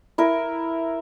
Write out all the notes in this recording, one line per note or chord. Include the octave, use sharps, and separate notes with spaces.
E4 A#4